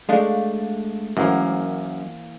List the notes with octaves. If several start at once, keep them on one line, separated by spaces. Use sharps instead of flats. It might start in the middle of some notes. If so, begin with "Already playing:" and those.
G#3 A3 D4 F5
F#2 E3 A#3 C5 F#5 D6